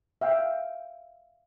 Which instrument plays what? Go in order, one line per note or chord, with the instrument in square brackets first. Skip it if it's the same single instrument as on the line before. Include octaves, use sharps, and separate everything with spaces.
[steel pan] E5 F5 G5